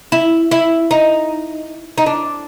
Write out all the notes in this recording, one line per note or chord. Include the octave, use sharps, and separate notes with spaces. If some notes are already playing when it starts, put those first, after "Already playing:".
E4
E4
D#4
D#4
D4